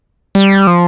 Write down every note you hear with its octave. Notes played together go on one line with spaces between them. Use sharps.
G3
F3